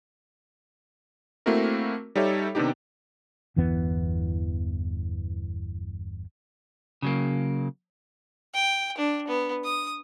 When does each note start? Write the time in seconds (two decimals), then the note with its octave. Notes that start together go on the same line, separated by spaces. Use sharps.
1.46 A3 A#3 C4 E4 F#4 A#4
2.15 G3 D#4 G4 A4 C#5 E5
2.55 C3 D#3 B3 D4 D#4 G4
3.56 G1 E2 E3 B3
7.02 C#3 F#3 A#3
8.54 G5
8.98 D4
9.27 B3
9.64 D#6